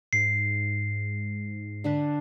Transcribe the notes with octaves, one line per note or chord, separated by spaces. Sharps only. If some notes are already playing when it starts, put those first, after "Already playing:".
G#2 C7
D3 D4 B4